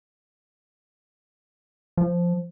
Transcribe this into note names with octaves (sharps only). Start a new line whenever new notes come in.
F3